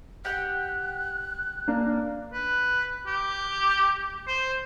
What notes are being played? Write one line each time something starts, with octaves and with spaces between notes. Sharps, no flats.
G4 F#5 G5 F#6
A#3 D4
B4
G4
C5